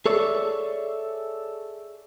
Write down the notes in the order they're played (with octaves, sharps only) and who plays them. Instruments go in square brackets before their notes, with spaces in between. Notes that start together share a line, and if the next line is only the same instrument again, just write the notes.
[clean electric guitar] G#4 A4 C#5 D5 E5